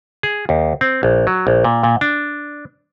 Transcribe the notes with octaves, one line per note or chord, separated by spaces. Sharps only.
G#4
D#2
C4
A#1
F#3
A#1
A#2
A#2
D4